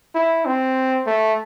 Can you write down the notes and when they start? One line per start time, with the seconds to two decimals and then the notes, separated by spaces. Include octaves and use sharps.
0.15 E4
0.46 C4
1.07 A3